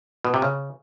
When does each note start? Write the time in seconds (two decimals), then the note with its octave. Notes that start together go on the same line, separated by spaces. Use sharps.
0.25 B2
0.34 C3
0.42 C#3